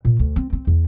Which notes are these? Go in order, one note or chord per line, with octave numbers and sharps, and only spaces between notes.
A#2
D2
C4
C4
E2